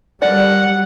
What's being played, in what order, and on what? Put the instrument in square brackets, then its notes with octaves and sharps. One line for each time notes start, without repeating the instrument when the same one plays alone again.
[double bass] G3 [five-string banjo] A4 A#4 D5 [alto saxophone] F#5